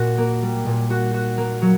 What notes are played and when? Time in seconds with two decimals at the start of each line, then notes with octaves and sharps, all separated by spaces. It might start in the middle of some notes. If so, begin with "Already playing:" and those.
Already playing: A#2 F#4
0.18 A#3
0.42 G3
0.66 A#2
0.90 F#4
1.14 F#4
1.38 A#3
1.62 F#3